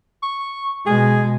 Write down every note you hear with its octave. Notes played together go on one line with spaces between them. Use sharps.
C#6
B2 G#3 G#4